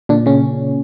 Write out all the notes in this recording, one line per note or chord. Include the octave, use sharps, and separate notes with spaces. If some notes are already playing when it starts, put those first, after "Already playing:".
A#2 D3 D4
C#3 C#4